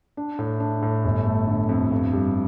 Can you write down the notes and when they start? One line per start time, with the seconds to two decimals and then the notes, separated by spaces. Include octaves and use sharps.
0.17 D4
0.39 A2
0.60 D4
0.82 A2
1.05 G1
1.26 A3
1.47 D3
1.69 F2
1.91 G2
2.13 G3